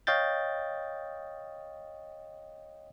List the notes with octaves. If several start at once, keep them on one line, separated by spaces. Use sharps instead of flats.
C#5 D#5 F5 G5 G6 A6